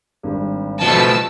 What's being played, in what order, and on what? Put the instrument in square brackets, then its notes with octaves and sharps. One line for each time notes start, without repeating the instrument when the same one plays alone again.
[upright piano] G#1 G2
[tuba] B2 [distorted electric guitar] F3 A3 [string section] A5 E6